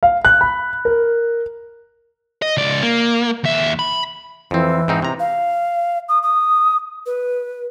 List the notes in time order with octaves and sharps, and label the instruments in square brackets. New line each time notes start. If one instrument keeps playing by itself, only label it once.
[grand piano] F5
F#6
B5
A#4
[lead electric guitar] D#5
C#2 D5
A#3
D#2 E5
B5
[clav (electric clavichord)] F2 C4 [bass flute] E3
[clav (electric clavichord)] G#2 C4 D#4
C3 A#5
[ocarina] F5
D#6
D#6
B4